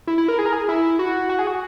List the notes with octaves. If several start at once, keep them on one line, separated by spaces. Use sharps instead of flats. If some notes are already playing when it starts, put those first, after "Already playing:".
E4
E4
A#4
G#4
A#4
G#4
E4
F#4
F#4
G#4
F#4